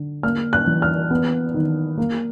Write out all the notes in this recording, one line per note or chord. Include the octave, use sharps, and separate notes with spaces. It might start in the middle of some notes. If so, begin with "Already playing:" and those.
Already playing: D3
A#3 F6
F#6
E3
F6
B3
D#3
A#3